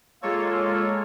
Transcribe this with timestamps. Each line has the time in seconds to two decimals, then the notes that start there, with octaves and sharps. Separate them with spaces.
0.22 G#3 A#3 F4 A4 C#5